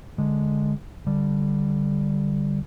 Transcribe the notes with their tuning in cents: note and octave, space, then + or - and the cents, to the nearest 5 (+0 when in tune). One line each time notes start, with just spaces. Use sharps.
D3 +0 G#3 +0
D3 +0 G3 +0